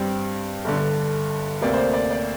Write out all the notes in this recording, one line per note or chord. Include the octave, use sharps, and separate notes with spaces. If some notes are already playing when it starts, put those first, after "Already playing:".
Already playing: G2 G3 C4
G1 G2 D3
D2 C3 A#3 D5
C5
D5
D5
D5